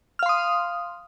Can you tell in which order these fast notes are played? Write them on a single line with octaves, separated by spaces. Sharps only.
F6 F5 C6 D#6